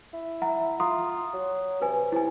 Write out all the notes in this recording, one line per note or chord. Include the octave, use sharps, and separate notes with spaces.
E4
E5 F#5 A#5
F4 A#5 C6 D#6
F#3
C3 B4 G#5
C3 E4 G#5